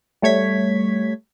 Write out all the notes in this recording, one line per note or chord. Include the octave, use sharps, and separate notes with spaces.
G3 A3 C#5 G#6 B6